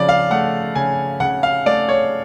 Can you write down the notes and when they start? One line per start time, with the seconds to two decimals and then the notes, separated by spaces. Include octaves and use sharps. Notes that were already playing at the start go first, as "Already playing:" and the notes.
Already playing: C#3 F3 D5
0.09 F5
0.31 A3 F#5
0.75 C#3 G#5
1.20 C#3 F#5
1.43 F5
1.66 A3 D5
1.89 C#5